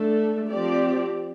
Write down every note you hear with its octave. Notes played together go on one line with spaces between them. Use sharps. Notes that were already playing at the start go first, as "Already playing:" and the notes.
Already playing: A3 D4 A4
F3 C4 G4 D5